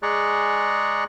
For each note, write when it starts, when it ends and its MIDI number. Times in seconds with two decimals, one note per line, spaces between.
0.03 1.04 56
0.03 1.04 68
0.03 1.04 74
0.03 1.04 82
0.03 1.04 85
0.03 1.04 90